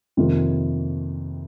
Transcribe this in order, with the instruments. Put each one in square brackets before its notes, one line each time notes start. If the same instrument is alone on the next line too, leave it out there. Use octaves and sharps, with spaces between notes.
[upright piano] F2 C3 D#3 A#3 F4